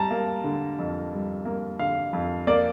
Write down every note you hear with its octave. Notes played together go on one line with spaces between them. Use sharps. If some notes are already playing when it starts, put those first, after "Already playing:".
Already playing: G3 A5 A#5
A#3
D3
F2
G3
A#3
D3 F5
F2
A#3 D5